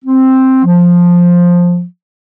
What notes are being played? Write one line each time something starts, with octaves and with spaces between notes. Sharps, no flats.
C4
F3